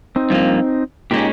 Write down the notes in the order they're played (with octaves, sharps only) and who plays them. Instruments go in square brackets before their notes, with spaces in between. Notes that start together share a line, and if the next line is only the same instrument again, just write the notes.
[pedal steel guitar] C4 D#4
[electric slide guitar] G2 F3 A#3
[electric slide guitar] A#2 G#3 C#4 [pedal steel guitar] D#4 G4